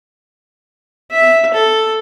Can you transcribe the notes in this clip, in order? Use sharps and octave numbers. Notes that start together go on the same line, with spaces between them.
E5
A4